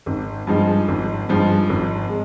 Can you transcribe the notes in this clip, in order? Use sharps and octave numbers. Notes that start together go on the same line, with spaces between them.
G#1
G2 F3 G#3 D#4
G#1
G2 F3 G#3 D#4
G#1
G#3